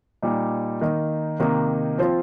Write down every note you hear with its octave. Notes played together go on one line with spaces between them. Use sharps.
A#2 G3 D#4
D#3 A#3 D#4
C3 D#3 A#3 D#4
F3 C4 F4